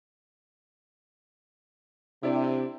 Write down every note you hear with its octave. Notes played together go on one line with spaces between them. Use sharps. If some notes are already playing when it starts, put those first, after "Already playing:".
C3 D4 E4